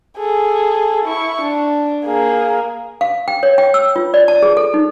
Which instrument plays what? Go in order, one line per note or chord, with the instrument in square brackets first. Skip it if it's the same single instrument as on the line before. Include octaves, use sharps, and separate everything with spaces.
[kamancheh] G#4 A4
E4 C#6
D4
A#3 G#4
[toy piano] F5
G5
C#5
G5
E6
F4
D5
A5
G#4
A4
D#4